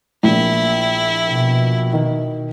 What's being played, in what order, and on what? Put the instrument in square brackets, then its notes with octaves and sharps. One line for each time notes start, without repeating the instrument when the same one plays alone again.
[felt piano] A#1 A#2 [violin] E4
[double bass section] B2
[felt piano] D#3